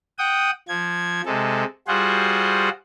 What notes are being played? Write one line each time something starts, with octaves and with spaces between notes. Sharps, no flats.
F#5 G5 D#6
F3 G#6
C3 G#3 A4
G3 F4 F#4 G#4 C5 F#5